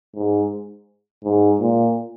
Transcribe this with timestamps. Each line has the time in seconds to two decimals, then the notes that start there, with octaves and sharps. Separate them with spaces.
0.15 G#2
1.24 G#2
1.60 A#2